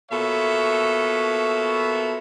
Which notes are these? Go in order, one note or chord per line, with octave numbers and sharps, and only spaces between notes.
B2 A#3 F4 A4 C#5 E5